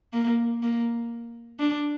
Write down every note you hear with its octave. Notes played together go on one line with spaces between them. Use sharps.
A#3
A#3
D4